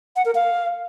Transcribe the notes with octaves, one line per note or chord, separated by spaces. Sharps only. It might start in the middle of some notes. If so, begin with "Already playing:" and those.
F#5
A#4
F5